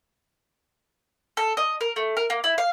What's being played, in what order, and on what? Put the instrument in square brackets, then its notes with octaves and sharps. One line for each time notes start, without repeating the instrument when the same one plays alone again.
[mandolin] A4
D#5
A#4
A3
A#4
A#3
E4
F5